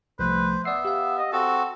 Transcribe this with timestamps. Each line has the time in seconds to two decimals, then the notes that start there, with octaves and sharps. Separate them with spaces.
0.19 C2 F3 A3 B4 C5
0.65 B3 D5 E5 C7
0.85 G4 F5
1.18 D#5
1.33 C4 F#4 A4